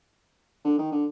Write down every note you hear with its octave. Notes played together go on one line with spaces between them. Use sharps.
D3
D#3
D3